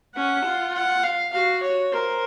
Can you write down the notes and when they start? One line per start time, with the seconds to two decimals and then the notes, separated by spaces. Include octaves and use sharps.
0.16 C#4 F#5
0.45 F4
0.74 F#5
1.03 F5
1.33 F#4 F5
1.63 C#5
1.92 A#4 C5